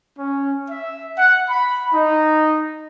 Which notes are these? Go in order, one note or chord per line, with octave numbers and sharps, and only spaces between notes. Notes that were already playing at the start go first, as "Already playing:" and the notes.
C#4
E5
F#5
B5
D#4